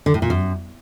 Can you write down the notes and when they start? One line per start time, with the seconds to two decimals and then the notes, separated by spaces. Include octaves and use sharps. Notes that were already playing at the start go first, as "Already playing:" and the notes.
0.06 D3
0.14 A2
0.22 A#2
0.30 F#2